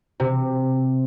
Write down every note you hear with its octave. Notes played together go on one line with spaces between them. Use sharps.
C3